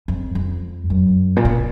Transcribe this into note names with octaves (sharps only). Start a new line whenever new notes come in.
F2
F2
F#2
A#2
B2